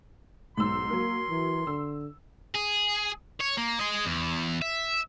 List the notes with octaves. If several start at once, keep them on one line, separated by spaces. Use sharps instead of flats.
B1 G#2 C6 E6
F#3 A#3 A#4
E3
D3 E6
G#4
C#5
A#3
G#4 D#5
E2
E5